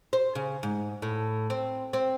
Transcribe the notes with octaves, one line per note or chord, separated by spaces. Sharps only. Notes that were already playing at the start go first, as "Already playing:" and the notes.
C5
C#3
G#2
A2
C4
C4